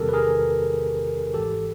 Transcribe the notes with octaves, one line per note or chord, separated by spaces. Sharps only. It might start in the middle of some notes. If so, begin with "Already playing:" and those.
Already playing: E2 C3 D#3 G3 C4 G4 A4 A#4
B4
G#4 A#4
G#1 G#2 E3 G#3 G4 A4